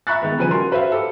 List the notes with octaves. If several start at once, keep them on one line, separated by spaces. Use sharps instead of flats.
E5 A#5 B5 C#6 F#6 A6
D#3 G#3 B3
C#3 F3 G3 B4 G#5 D#7
F#4 A#4 C6
F#4 B4 C5 E5 F5
G4 A4